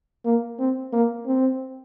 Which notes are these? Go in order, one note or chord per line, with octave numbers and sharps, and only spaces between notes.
A#3
C4
A#3
C4